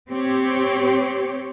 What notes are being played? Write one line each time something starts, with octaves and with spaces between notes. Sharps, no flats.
C4 G4 C#5